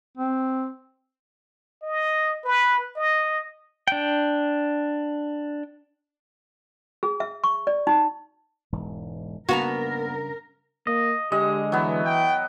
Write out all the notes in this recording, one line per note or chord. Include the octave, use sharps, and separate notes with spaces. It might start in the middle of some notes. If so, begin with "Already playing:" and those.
C4
D#5
B4
D#5
D4 G5
G#4
E5
C#6
D5
D#4
E1 G#2 E3
C#3 G3 A#3 B3 D4 F#4 A#4 A#5
A#3 D#5
D3 G#3 G4 D#5
E3 F#3 B3
G5